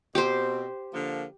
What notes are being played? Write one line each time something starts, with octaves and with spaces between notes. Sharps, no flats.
B2 C4 G4 C5
D3 F3 A#3